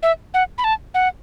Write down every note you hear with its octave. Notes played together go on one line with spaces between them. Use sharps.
E5
F#5
B5
A5
F#5